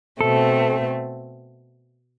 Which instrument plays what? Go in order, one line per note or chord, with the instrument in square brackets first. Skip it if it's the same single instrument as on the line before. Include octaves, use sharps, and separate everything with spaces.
[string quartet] B2 A3 C4 [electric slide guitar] A4